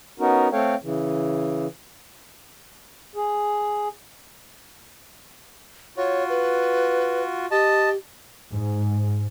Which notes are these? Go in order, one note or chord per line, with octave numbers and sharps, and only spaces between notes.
B3 C#4 D#4 F#4 A#4
A3 C4 A4 C#5 F5 G5
C#3 E3
G#4
F4 F#4 C#5
B4
G4 D#5 A5
G#2